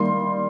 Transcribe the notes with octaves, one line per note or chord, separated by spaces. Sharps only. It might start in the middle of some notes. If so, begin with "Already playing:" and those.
Already playing: D#3 G3 A#3 C6